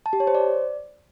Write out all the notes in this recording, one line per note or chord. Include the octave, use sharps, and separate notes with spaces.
A5
G4
C#5
C5
D5